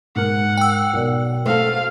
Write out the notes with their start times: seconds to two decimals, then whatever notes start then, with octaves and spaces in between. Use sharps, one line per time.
0.16 G#2 A#4 F#5 F6
0.57 G5 E6
0.93 B1 A#4 D5
1.45 A3 F#4 A4 C5 F5